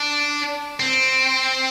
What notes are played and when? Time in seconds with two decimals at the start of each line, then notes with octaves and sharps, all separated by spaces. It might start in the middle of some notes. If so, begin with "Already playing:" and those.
Already playing: D4
0.80 C4